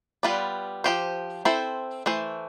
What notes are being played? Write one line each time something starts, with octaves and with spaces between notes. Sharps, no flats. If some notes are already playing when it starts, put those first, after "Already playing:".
G3 B3 F4 B4 D5
F3 C4 G4 C5
C4 E4 A4 C5
E3 A3 C5